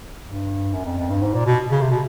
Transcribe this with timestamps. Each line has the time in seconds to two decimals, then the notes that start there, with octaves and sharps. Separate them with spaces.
0.24 G2
0.73 F#2
0.85 F2
0.98 F2
1.10 G2
1.22 G#2
1.34 A#2
1.46 B2
1.71 C#3
1.81 C3
1.91 B2